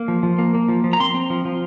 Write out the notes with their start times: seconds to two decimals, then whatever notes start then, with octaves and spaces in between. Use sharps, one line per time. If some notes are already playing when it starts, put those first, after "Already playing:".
Already playing: A#3
0.08 F3
0.23 F3
0.39 A#3
0.54 A#3
0.68 F3
0.84 F3
0.93 A#5
1.00 C4 C6
1.14 C4
1.30 F3
1.45 F3